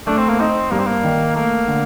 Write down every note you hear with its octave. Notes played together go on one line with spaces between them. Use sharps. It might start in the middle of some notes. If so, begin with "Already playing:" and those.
A3 D4
C4
A#3
C4 D#4
G2 A#3
C4
A#3
D#3
A3 A#3
D3